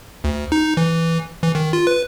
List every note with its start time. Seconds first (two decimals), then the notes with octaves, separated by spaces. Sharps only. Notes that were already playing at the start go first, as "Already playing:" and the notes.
0.24 D2
0.52 D#4
0.77 E3
1.43 E3
1.55 D#3
1.73 F4
1.87 B4